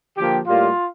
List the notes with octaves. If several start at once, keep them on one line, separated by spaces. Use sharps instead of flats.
D3 F3 A#3 G4
A2 G3 A#3 F4